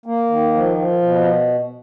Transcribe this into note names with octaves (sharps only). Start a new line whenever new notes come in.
A#3
D#3
F3
F3
B2